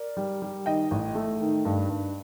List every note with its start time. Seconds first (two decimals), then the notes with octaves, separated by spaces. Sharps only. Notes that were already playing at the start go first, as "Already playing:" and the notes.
Already playing: A#4 D5
0.17 G3
0.42 G3
0.66 D#3 D#5 G5
0.91 A1
1.15 A3
1.40 D#3
1.65 G2
1.89 G2